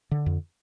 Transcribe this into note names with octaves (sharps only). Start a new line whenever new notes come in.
D3
F2